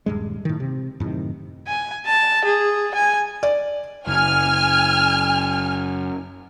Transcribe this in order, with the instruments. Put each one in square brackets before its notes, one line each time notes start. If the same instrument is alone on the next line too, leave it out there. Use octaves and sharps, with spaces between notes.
[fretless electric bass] D#1 G2 G#3
A2 D#3
C3
F#2 A2 C3 D#3
[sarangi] G#5
A5
G#4
G#5
[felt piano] D5
[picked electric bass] F#1 [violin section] G#5 F6